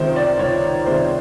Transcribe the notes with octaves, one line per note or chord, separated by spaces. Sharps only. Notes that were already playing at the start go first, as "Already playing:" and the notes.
Already playing: C#2 C3 D#3 G#3 A#4 C5
D5
C#2 C#5
C3 D#3 G#3 C5